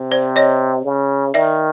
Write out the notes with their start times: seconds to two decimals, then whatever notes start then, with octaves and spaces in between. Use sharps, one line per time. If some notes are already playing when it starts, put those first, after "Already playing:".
Already playing: C3
0.11 C5 D5
0.36 C#5 D#5
0.84 C#3
1.34 D#3 D5 E5